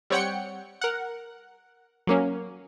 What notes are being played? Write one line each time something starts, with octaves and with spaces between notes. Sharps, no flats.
G3 C4 C#5 F#5 G5 C#7
A#4 F#5
F#3 A#3 C#4